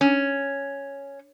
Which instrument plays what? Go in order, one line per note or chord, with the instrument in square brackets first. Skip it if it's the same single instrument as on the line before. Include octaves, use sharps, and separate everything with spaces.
[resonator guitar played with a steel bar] C#4